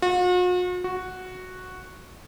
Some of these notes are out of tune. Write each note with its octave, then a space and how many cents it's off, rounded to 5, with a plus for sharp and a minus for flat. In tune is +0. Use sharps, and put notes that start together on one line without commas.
F#4 -45
F#4 -5